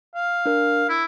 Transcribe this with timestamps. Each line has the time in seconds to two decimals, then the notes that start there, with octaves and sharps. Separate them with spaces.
0.15 F5
0.46 D4 A#4
0.89 E4